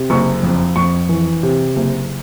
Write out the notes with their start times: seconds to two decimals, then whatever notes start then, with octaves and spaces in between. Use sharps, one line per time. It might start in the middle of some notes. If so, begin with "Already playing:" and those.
Already playing: C3
0.10 F#1 C#6
0.43 F2
0.76 F2 C#6
1.09 E3
1.43 C3
1.76 F#1